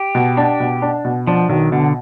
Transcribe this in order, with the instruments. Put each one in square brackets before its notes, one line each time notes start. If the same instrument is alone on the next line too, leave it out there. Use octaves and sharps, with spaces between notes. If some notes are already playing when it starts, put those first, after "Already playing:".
Already playing: [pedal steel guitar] G4
[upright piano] B2
D4
B2
D4
B2
[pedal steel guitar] F3 [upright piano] D4
[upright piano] B1 [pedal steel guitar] D#3
[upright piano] B2 [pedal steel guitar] D3